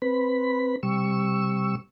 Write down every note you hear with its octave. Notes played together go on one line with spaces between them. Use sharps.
C4 B4 B5
C3 G3 C#6 E6